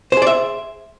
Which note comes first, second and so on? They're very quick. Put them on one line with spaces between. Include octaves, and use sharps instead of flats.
C5 G#4 D5 E5